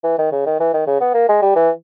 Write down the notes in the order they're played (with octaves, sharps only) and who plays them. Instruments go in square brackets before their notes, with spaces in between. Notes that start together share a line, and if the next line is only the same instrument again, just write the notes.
[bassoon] E3
D#3
C#3
D#3
E3
D#3
C#3
B3
A#3
G#3
G3
E3